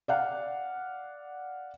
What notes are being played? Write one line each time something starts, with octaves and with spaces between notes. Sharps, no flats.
D5 F5 F#5